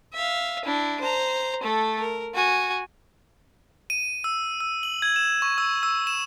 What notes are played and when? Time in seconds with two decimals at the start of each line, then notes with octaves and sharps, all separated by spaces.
0.14 E5 F5
0.65 D4 E4
1.00 C5 A#5
1.63 A3 A4
2.00 A#4
2.35 F#4 G#5
3.90 D#7
4.24 E6
4.60 E6
4.83 F#7
5.02 G#6
5.16 E7
5.42 C#6
5.58 E6
5.83 E6
6.07 E7